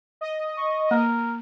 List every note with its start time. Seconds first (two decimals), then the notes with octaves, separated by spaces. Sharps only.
0.21 D#5
0.57 C#6
0.91 A#3 A#4